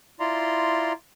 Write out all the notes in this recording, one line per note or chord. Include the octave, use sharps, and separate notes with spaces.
E4 F4 D5 A#5 C6